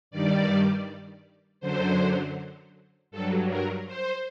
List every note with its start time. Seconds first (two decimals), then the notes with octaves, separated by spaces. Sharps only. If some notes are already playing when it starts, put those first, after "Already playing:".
0.11 G2 D#3 G3 D5
1.60 F#2 D3 F#3 C5
3.11 G2 F#3 A4
3.49 A#4
3.86 C5